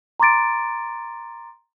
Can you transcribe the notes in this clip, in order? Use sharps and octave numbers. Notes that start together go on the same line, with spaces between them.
A#5 C6 D6 A6 D7